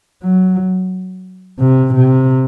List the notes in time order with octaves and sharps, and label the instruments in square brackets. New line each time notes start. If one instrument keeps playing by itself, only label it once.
[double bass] F#3
C3
C3